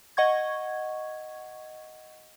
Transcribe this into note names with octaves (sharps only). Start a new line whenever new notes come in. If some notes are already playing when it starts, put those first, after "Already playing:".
D#5 F#5 C#6 G#6